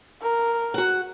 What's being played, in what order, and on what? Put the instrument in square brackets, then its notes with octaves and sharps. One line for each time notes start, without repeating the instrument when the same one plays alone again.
[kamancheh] A#4
[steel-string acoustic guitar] F#4 F#5